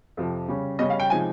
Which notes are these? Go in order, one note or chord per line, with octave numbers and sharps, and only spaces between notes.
F2 C3 F3
C#3 G3 C#4
C#3 G3 C#4 D#5
F5
G5
C3 F3 G#3 D#4 G#5